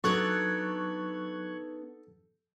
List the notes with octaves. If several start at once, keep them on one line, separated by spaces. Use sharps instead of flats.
F#3 B3 D4 D#4 A4 C#6 F#6 G#6